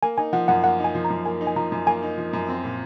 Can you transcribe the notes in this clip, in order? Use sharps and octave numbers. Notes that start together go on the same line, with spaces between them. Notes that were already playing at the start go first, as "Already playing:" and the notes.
A#3 G#5
D#4 G#5
F3 F#5
F#2 F#5
A#3 F#5
D#4
G#5
F3
A#5
F#2
A#3 G#5
D#4
G#5
F3 A#5
F#2
A#3 G#5
D#4
F3
F#2
C4
A#2